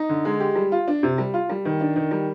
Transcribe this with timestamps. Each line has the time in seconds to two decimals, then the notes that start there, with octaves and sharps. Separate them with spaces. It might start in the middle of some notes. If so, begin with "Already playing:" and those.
Already playing: D#4
0.09 D3
0.25 G#3
0.40 G4
0.55 G3
0.72 F4
0.88 D4
1.03 C3
1.18 G3
1.34 F4
1.49 G3
1.65 D#3
1.81 D4
1.96 D#3
2.11 G3